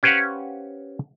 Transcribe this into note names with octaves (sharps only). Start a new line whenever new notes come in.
C#4 G4 B4 C5 F5 F#5